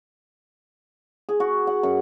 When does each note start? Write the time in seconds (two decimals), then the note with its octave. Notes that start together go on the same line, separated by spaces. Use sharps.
1.29 G#4
1.40 F#4
1.67 F#5
1.83 F#2